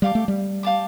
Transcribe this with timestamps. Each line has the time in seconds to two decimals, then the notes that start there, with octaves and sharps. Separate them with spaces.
0.02 G3 G4 F5 A5 D6
0.15 A3
0.28 G3
0.63 G4 F5 A5 D6